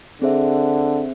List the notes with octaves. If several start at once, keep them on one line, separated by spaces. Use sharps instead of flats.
D3 C4 G#4 C5 E5